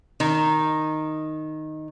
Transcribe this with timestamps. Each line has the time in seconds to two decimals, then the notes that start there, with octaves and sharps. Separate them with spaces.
0.20 D#3 D#4